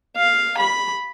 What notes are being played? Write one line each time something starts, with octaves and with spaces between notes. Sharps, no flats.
F5
B5